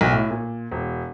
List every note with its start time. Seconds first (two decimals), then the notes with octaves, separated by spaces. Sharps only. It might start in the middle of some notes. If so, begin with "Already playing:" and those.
0.01 B1
0.13 A2
0.31 A#2
0.72 E1